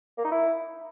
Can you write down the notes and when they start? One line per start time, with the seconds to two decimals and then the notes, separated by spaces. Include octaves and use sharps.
0.18 A#3
0.25 D#4
0.32 E4